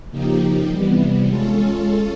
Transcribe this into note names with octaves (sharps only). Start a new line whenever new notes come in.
C#3 F3 A#3 D#4 G4
C3 E3 G3 B3
G#3 C#4 F4 A4